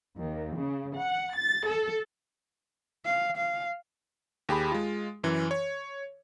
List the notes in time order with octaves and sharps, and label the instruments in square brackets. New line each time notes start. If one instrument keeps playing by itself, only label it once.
[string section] D#2
C#3
F#5
A6
A4
[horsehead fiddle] F5
F5
[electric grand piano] D#2 G4 G#4 B5
G#3 F4
F#2 E3
C#5